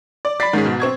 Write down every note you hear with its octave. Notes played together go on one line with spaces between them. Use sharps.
D5
D5 B5 A6 B6 C7
G#2 D#3 C#4 G#4
B2
C4 C#6 G#6